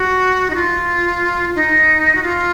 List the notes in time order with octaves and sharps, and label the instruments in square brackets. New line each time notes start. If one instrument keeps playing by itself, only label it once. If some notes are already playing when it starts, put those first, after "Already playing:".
Already playing: [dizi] F#4
D#4
F4
D#4
F#4
F4